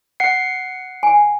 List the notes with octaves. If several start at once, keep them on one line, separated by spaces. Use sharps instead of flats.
F#5 C7
G#5